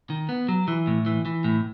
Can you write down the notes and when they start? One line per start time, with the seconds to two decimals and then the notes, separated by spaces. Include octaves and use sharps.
0.10 D#3
0.29 B3
0.49 F#3
0.68 E3
0.87 A2
1.06 E3
1.25 E3
1.44 A2